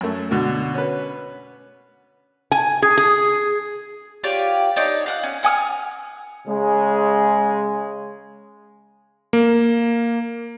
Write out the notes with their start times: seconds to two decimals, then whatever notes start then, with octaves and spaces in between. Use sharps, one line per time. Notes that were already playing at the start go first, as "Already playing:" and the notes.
0.01 F#2 A3
0.31 B2 D3 F#4
0.74 C#4 B4
2.52 G#5
2.82 G#4
2.98 G#4
4.24 F4 G4 C#5 D5
4.76 D4 D#4 C#5
5.06 F5 F#5 F#6
5.23 C#4
5.43 F#5 G#5 D#6 F6
6.47 C#3 G#3
9.33 A#3